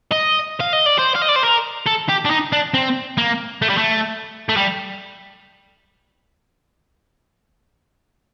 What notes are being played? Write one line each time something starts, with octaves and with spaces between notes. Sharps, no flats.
D#5
F5
D#5
D5
C5
F5
D#5
D5
C5
A#4
A4
G4
D4
D#4
D4
C4
A#3
A3
G3
A3
A3
G3